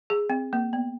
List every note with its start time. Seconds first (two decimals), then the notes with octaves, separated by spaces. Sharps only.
0.10 G#4
0.30 C4
0.53 A#3
0.73 B3